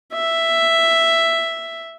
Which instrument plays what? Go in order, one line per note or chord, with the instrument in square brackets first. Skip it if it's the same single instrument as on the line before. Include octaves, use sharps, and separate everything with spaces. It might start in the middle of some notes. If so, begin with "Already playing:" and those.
[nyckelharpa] E5